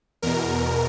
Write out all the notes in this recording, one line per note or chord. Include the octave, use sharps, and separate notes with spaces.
E2 B2 A#4